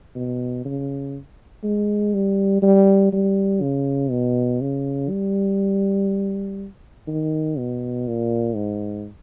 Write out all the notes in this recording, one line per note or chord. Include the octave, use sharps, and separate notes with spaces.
B2
C#3
G#3
G3
G3
G3
C#3
B2
C#3
G3
D#3
B2
A#2
G#2